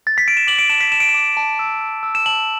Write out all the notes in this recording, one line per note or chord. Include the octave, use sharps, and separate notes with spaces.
A6
B6
D7
E7
D6 F#7
D7
A5 E7
B6
A5 E7
D7
E7
D6
A5
E6
E6
E6
E7
A5 F#7